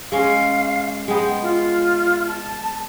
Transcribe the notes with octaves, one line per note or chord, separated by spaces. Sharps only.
G#3 C#4 F5
G#3 B3 G5
F4
A5